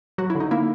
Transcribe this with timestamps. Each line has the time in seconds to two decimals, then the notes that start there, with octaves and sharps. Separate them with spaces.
0.18 F#3 F#4
0.30 E4
0.35 D3
0.40 D#4
0.51 A#3 E4